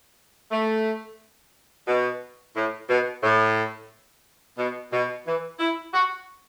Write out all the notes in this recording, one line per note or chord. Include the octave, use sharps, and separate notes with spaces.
A3
B2
A2
B2
A2
B2
B2
E3
E4
F#4